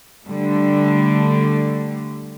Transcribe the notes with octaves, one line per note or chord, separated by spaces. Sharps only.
D3 G3 A3